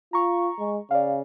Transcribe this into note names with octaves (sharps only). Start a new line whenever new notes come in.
F4 A#5 C#6
G#3
C#3 D5 F5